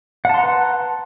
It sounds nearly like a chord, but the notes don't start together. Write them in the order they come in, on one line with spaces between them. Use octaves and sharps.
F#5 A5 C6 A#5 B4